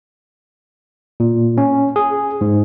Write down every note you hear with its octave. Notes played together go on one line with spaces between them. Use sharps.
A#2
C#4
G#4
G#2